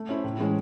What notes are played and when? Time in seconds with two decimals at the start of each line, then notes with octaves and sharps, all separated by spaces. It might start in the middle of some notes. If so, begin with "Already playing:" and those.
Already playing: A3
0.09 C#4 E4 C5
0.24 A2
0.39 E3 G#3 C#4